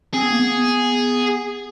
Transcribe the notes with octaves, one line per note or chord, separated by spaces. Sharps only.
C4 G#4
B3
A#3
B3